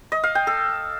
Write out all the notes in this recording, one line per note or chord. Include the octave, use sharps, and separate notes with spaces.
D#5
F5
G5
A4